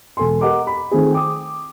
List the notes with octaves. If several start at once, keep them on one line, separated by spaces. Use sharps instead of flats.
E1 A4 G#5 C6
G4 A#4 D#5 F#5 A#5 D6
B5
D#3 A3 C4 F4 G#4
G5 D6 D#6